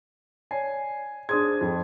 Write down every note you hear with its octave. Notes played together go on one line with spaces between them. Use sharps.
C#5 D5 G#5 C7
D4 G#4 C5 C6 D#6 G#6
F2